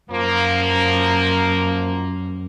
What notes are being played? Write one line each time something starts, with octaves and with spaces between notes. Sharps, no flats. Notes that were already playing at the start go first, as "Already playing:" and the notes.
F#2 F3 A#3